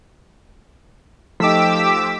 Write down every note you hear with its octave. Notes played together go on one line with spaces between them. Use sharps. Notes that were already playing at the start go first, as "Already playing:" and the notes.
F3 A3 D#4 G4 D6 E6 B6